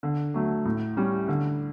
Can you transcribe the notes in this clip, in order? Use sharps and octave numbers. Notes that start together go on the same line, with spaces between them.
D3
F#3 A3
A2
G3 C#4
D3